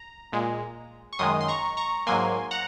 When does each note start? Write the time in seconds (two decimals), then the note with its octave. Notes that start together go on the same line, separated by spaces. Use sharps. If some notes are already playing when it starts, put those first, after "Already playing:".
Already playing: A#5
0.33 A#2 G#3
1.13 C#6
1.19 F#2 D#3 G#3 C6 D#6
1.41 C6
1.48 A#5 C#6
1.77 A#5 C#6
2.07 G#2 F#3 A#3 G#5 C6
2.51 F#5 A#5